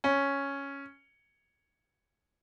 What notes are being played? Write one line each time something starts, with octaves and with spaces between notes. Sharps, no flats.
C#4